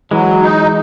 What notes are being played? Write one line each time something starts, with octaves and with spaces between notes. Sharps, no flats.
E3 F#3 G#3
D#4